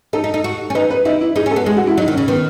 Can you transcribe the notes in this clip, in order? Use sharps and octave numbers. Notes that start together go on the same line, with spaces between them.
D#4 A4
D#4
D#4
F#4
C#4
D#4 B4
B4
D#4 E4
E4
D#4 G#4
C#4
A4
B3
G#3 G#4
F#4
E4
F#3 D#4
D#3
C#4
C#3
D#3 B3